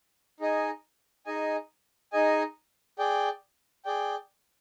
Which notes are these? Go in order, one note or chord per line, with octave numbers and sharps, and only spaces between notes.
D#4 G#4 D#5 G#5
D#4 G#4 D#5 G#5
D#4 G#4 D#5 G#5
G#4 D5 G5
G#4 D5 G5